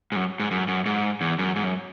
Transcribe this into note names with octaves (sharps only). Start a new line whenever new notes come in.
G#2
F#2
G#2
F#2
F#2
G#2
E2
F#2
G#2
F#2